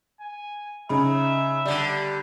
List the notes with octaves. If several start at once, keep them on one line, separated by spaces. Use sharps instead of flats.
G#5
C#3 D#4 E5 B5
D3 G3 D5